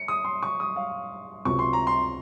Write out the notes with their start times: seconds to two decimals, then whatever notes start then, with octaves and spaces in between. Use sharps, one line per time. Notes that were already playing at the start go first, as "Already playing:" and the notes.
Already playing: C#7
0.08 D#6
0.24 C6
0.43 C#6
0.60 D#6
0.76 F5
1.45 C#2 C3 F#3 C#6
1.59 C6
1.73 A#5
1.87 C6